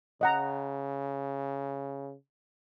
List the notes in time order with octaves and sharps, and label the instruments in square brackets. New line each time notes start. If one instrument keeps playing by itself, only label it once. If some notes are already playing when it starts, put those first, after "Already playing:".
[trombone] C#3 [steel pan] D#5 F#5 A#5